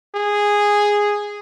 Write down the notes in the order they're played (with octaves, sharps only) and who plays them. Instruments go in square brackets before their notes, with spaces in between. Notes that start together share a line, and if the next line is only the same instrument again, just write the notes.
[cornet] G#4